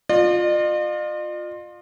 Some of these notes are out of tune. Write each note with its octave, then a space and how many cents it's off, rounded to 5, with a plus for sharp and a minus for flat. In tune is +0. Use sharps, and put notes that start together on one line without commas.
F4 +15 D#5 -45